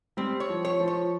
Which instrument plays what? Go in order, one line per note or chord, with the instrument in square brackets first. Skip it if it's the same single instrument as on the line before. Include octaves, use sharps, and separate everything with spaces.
[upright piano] G3 [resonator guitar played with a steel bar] C4
[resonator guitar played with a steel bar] C#5
[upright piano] F3
[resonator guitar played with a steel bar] C#5
[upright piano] F3
[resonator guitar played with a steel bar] C#5